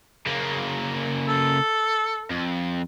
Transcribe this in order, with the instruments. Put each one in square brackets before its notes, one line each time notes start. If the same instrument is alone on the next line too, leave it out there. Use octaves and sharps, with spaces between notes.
[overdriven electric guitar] C#3 A#3
[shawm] A4
[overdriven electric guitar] F2